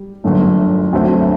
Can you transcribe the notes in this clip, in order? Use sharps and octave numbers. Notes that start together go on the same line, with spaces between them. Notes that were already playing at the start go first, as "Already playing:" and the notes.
Already playing: G3
G1 F#2 D3 F#3 A3
D2 D3 F#3 A3 C4